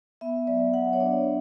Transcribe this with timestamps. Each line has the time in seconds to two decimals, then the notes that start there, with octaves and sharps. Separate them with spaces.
0.21 B3 E5
0.47 F#3 D5
0.74 F#3 F#5
0.93 C#5
1.00 D4 D5